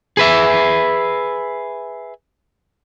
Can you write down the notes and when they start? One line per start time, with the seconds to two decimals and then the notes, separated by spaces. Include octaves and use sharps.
0.17 G#4 B4 E5